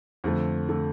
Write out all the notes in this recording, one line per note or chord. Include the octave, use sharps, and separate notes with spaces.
F2 D3 A3
D3 A3